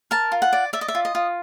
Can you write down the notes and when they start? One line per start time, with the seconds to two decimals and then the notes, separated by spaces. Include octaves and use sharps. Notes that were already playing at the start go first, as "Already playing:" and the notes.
0.11 A#4 A5
0.32 F4
0.42 F#5
0.53 D5
0.73 D5 E5
0.81 D#5
0.88 E5
0.95 F4
1.05 D#5
1.15 F4